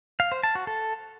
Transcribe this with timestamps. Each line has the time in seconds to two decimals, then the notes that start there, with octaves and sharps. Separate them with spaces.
0.20 F5
0.32 C5
0.43 A5
0.55 F#4
0.67 A4